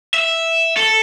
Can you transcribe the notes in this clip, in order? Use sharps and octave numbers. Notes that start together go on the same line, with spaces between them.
E5
A4